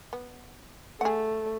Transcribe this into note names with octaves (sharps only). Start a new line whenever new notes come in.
B3
A3 G#4 F#5